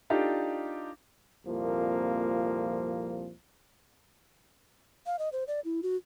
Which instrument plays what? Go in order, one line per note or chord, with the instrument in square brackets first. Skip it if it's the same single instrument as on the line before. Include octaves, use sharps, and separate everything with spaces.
[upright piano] D4 D#4 F4 G4 A4 D5
[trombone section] C2 F2 A#2 F3 A#3
[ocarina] F5
D#5
C5
D5
E4
F#4